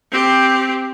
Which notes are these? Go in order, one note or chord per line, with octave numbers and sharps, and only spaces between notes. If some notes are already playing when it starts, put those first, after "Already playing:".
C4 G4